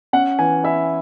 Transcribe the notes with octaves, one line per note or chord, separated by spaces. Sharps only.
C#4 F#5
E3 G#5
E4 E5